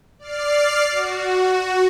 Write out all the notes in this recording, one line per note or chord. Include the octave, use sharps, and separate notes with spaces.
D5 F6 C7
F#4